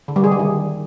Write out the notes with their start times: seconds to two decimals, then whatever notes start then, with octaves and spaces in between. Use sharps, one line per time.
0.08 D3
0.16 G3
0.24 G#4
0.31 G3
0.39 D#3